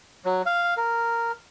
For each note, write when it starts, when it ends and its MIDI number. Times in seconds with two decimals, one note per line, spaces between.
0.25 0.42 54
0.46 0.74 77
0.77 1.32 70